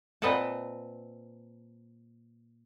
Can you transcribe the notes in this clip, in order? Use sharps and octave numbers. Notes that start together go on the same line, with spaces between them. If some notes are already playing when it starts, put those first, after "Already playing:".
A#2 C4 B4 D#5 F#5 A5